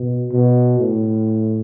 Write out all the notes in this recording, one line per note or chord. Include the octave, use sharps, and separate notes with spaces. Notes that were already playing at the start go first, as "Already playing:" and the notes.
Already playing: B2
B2
A2